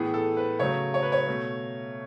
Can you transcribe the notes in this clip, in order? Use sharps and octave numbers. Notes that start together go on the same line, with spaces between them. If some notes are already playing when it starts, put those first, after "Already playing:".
Already playing: A2 E3 B3 G#4
A4
B4
C#3 F#3 A3 C#5
C#5
B4
C#5
B2 A3